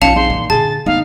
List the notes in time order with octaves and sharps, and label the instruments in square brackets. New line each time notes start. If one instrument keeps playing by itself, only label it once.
[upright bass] A#1 [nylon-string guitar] C#4 D#4 F4 [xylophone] F5 A5 F7 [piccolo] C#7
[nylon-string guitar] C4 D#4 G#4 [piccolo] C6
[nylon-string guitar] A#2 [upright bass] E3 D#4
[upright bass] A#2 D3 [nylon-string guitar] G#4 G#5 [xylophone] A5 [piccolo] A6
[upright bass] D2 B3 [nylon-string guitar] D#4 [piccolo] F5